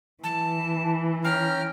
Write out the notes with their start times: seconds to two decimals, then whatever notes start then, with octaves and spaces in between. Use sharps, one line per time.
0.24 E3 A5
1.24 C#4 G5 A#5 F6